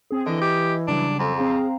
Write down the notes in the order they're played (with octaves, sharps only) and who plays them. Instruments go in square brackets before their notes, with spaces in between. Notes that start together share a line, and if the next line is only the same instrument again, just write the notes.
[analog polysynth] C4 G#4
[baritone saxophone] D3 [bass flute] E3 [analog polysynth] D#5
[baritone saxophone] G4
[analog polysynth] C#3 F#3 G3 [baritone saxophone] D4
[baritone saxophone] F2 [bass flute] A4
[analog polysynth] C4 F5 A#5 [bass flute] G#4